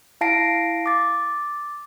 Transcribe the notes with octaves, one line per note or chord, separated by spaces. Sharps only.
E4 F5 A5 A#6 C7 D7
D6 A6